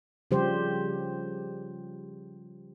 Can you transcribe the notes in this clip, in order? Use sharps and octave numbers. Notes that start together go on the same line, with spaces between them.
C#3 F3 G3 G4 C5